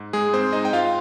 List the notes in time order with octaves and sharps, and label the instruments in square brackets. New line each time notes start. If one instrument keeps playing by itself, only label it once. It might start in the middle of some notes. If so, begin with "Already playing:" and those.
Already playing: [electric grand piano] G#2
G#3 G#4
G#2 C4 C5
D#4 D#5
G5
G#2 F4 F5